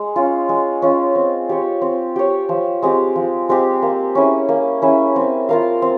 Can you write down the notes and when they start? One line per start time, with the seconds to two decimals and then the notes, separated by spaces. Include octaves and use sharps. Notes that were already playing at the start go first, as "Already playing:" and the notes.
Already playing: G#3
0.16 C#4 F4
0.49 G#3
0.82 C#4 F4
1.15 C4
1.49 G4 C#5
1.82 C4
2.16 G4 C#5
2.49 F3
2.82 G#3 C4 G4
3.16 F3
3.49 G#3 C4 G4
3.82 A#3
4.15 C#4 E4 G#4
4.49 A#3
4.82 C#4 E4 G#4
5.16 C4
5.49 F4 A#4 F5
5.82 C4